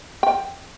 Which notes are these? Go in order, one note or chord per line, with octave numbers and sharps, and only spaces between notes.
G5